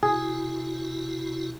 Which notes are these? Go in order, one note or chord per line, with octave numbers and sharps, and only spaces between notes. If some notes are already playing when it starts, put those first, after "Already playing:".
C3 E4 F#4 G#4